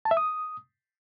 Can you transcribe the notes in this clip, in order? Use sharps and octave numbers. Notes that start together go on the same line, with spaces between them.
A5
E5
D#6